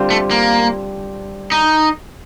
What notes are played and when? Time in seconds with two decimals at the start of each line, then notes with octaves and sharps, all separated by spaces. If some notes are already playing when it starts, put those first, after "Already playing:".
Already playing: D3 G3 C4 F4
0.10 A3
0.31 A#3
1.52 D#4